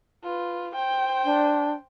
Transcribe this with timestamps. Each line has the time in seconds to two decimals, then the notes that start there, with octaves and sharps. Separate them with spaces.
0.24 F4 B4
0.75 C5 G5
1.24 D4